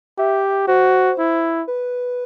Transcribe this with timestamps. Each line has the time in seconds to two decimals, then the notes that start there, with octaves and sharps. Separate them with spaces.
0.18 G4 E5
0.68 F#4 C5
1.19 E4
1.67 B4